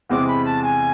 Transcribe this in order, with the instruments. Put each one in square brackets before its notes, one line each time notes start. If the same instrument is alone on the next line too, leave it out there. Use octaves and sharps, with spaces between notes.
[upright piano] E2 C3 E3 G#3 C4 [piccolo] D6
[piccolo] B5
A5
G#5